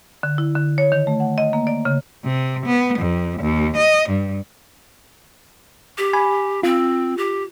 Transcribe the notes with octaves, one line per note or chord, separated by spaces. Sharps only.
D3
E4
D3
C#5
D#3
A3
F#5
D#5
A#3
D5
C#3
C3
B3
F2
D#2
D#5
G2
G4
G#5 B5
C4 F4
G4